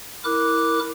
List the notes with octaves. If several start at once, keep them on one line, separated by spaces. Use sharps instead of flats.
E4 A#4 D6 F#6